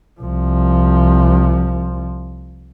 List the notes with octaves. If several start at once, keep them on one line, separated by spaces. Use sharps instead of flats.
C2 F3